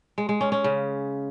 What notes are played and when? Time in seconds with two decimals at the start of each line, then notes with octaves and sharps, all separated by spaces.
0.18 G#3
0.29 G#3
0.41 C#4
0.52 C#4
0.64 C#3